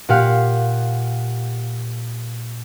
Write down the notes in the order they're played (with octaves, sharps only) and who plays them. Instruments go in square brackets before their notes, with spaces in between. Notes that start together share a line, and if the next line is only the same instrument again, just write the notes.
[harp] A#2 G4 F5 F#5